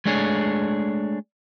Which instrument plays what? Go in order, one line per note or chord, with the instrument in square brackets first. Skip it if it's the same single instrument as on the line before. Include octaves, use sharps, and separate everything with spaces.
[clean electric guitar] G#3 A3 D4 G#4 C#5